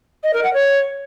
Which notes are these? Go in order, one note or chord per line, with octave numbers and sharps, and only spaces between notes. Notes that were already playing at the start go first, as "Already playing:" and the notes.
D#5
A#4
F#5
C#5